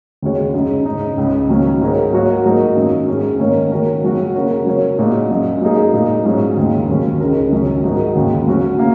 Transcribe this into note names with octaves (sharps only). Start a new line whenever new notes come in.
D#2 C#3 G#3 F#4 C#5
F#2 C#3 G#3 D#4
G#2 G#3 D#4
C#2 C#3 G#3
D#3 F#3 A#3 C#4
G#2 G#3 F#4 A#4 C#5
F#3 A#3 F#4 A#4 C#5
G#2 F#3 A#3 D#4 A#4
F#2 D#3 F#3 D#4
G#2 G#3 C#4
D#3 A#3 C#4 A#4 C#5
D#3 A#3 F#4 A#4 C#5
F#2 C#3 F#3 C#4 F#4
C#3 A#3 F#4 A#4 C#5
F#3 C#4 A#4 C#5
A#2 G#3 D#4 F#4
F#2 F#3 D#4
F#3 A#3 D#4 G#4
A#2 G#3 D#4
G#2 F#3 C#4 F#4
D#2 C#3 A#3
D#2 D#3 F#3 C#4
C#2 C#3 G#3 D#4 A#4
F#2 D#3 F#3 C#4
G#2 F#3 D#4 F#4 A#4
D#2 C#3 A#3 F#4
F#3 C#4 F#4 C#5
C#3 A#3